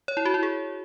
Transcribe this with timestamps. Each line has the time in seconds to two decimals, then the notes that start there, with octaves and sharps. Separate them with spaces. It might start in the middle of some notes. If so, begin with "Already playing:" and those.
0.08 C#5
0.17 E4
0.25 F#4
0.34 E4
0.43 G#4